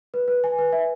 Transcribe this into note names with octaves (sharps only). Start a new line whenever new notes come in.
B4
B4
G#5
B4
E5